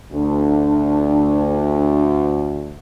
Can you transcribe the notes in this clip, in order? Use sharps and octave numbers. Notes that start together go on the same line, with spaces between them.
D2 D4